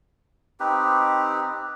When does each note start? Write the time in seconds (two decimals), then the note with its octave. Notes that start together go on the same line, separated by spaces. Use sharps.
0.60 C4 D#4 G4 B4